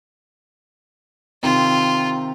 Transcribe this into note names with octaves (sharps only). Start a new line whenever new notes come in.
C3 D#3 C4 F4